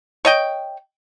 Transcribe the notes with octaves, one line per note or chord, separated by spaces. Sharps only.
C#5 D#5 G5